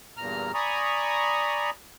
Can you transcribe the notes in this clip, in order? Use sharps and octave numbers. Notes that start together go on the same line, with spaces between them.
E2 G2 A#2 A#5 F6
D5 G#5 A#5 B5 C#6 D#6